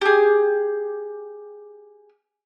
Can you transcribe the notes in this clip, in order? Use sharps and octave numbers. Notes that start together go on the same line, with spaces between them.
G4 G#4